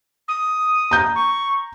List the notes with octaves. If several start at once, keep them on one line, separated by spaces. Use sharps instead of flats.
D#6
A#5 G6
C#6